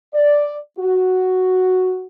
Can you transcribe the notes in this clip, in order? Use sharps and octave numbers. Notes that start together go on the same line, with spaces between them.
D5
F#4